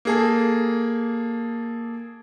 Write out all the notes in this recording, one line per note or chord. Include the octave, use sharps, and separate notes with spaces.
A#3 G#4 A4